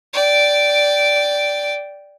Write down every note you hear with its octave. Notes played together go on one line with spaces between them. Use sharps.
D5 G5